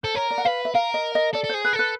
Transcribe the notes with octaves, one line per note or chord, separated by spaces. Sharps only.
A4 C5
A#4 C#5
D5
F#5
B4 F5
E5
A#4 F5
D#5
D#5
A4 D5
A4 C5
G#4
B4
A4
B4